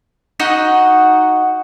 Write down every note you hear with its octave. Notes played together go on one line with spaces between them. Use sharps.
D#4 F#4 D#5 F#5